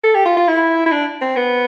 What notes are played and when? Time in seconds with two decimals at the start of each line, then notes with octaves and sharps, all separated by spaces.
0.04 A4
0.15 G4
0.25 F4
0.37 F4
0.48 E4
0.86 E4
0.91 D4
1.21 C4
1.36 B3